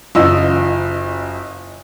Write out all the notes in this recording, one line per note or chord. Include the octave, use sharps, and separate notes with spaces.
F#1 F4 D#5 E6